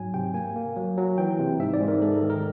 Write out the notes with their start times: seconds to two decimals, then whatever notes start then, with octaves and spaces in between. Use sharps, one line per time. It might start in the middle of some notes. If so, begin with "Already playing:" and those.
Already playing: G#2 F#3 G#5
0.14 C3 G5
0.34 A#3 G#5
0.56 A#3
0.77 F#3
0.97 F#3
1.18 E3 G5
1.39 C3
1.60 G#2 E5
1.74 D5
1.81 G#2
1.88 A#4
2.02 G#3 A4
2.16 A#4
2.23 D#3
2.30 A#4